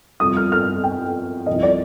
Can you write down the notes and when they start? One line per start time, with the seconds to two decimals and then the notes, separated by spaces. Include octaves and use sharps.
0.20 F2 C3 G3 D#6
0.37 F6
0.52 F6
0.84 G5
1.46 C2 C3 F3 D#5
1.63 D5